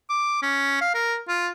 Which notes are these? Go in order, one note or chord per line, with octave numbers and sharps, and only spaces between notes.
D6
C#4
F5
A#4
F4